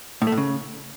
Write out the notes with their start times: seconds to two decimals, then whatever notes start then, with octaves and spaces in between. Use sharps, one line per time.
0.22 A2
0.27 A3
0.32 A2
0.38 C#3